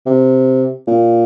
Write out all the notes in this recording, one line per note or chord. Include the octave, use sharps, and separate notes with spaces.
C3
A#2